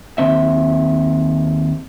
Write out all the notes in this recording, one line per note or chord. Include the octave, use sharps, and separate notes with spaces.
D#2 C4 E5